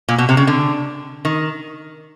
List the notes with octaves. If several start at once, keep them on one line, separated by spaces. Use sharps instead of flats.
A#2
B2
C3
C#3
D3
D#3